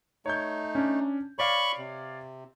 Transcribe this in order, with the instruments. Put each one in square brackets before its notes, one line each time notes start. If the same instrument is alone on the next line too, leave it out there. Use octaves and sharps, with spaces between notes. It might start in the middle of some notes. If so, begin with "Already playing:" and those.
[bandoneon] A3 D#4 [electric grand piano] C#5 G6
[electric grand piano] C#4 D4
[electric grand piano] C#5 D5 F5 [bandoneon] B5 C#6
[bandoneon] C3